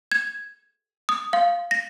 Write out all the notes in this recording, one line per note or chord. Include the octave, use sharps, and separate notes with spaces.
G#6
D#6
F5
A#6